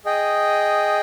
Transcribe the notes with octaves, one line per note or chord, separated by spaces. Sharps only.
G#4 D#5 G5